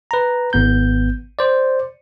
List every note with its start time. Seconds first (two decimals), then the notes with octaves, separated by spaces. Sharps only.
0.11 B4 A#5
0.53 G#1 B3 G6
1.39 C5 D5